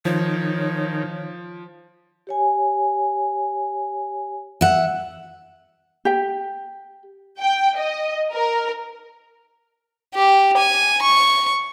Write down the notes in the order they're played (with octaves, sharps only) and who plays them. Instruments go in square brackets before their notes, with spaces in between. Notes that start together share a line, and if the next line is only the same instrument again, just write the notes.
[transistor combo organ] D#3 [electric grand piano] F3 [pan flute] C#5
[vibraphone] G4 C#5 G#5
[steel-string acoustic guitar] E5 F#5
[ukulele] G4 G5
[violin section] G5
D#5
A#4
[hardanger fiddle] G4
G#5
C#6